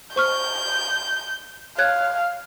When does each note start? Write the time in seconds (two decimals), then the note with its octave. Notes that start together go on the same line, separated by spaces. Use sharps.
0.16 C5 C#6 F6 G6
1.78 C#5 F5 F#6 G#6